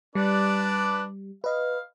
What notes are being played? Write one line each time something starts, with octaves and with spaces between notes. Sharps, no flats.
G3 D4 B4 D5
B4 D#5 F5